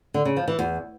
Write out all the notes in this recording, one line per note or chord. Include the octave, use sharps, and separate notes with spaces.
D3
C#3
F3
E3
E2